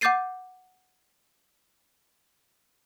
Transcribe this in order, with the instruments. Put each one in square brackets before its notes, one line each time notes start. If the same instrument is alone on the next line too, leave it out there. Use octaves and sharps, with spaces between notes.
[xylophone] F#5 D6 G6 A6 C7 D#7